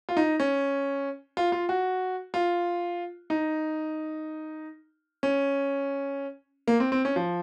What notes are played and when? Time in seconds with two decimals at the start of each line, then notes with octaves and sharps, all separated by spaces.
0.09 F4
0.17 D#4
0.40 C#4
1.37 F4
1.52 F4
1.69 F#4
2.34 F4
3.30 D#4
5.23 C#4
6.68 A#3
6.80 C4
6.92 C4
7.05 C#4
7.16 F3